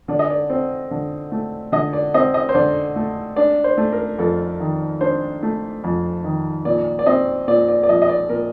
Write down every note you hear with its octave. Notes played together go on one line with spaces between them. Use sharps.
D3 D5
D#5
D5
C4
D3
A3
D3 D#5
D5
C4 D#5
D#5
C5
D3 D5
A3
D4 D5
C5
A3
A#4
F2 A4
D#3
D4 C5
A3
F2
D#3
A#2 D5
D5
C4 D#5
A#2 D5
D5
D5
F3 D#5
D#5
D5
A#2 A#4